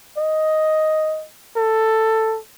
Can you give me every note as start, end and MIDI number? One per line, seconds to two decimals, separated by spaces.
0.18 1.25 75
1.56 2.38 69